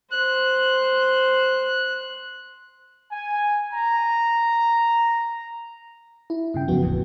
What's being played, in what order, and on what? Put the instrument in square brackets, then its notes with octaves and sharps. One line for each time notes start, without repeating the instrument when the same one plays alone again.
[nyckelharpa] C5 [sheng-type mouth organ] F#6
[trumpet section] G#5
A#5
[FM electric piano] E4
G2 C#3 G5
[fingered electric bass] F#2 F3 [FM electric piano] B3 F#4
[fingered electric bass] D1 A1 E2